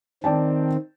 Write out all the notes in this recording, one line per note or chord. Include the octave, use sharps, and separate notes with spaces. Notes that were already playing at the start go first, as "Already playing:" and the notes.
D#3 C4 D5 G5 A5